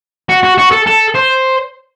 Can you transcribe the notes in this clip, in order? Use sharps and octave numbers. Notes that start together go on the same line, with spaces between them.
F#4
F#4
F#4
A4
A4
C5